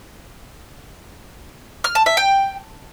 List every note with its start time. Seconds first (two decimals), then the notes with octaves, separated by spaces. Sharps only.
1.84 F6
1.95 A5
2.06 E5
2.17 G5